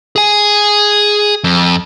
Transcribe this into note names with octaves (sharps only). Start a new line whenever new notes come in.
G#4 G#5
F2